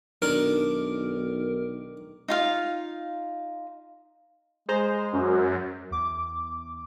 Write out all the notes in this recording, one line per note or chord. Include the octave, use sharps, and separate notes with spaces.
B1 D#3 D4 A#4
D#4 F4 F5
G#3 G#4 C5 A#5
F#2
E2 D6